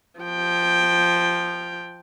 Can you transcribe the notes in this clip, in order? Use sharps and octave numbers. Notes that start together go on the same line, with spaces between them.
F3 G5